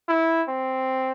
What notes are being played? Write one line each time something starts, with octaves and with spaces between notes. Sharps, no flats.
E4
C4